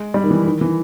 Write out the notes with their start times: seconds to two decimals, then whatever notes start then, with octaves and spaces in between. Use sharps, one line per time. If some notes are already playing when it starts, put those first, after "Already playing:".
Already playing: G#3
0.14 G3
0.24 D#3
0.31 E3
0.45 D#3
0.61 E3